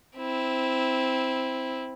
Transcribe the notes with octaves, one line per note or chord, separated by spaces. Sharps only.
C4 E4